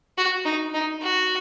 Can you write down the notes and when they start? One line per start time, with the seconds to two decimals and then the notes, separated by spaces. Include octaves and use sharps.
0.18 F#4
0.45 D#4
0.74 D#4
1.02 F#4